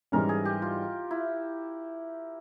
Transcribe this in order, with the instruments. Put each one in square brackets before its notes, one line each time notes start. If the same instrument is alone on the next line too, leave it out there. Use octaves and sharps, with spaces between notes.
[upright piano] G#2 E3 G3 C#4 [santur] A#4
[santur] G#4
G4
F4
E4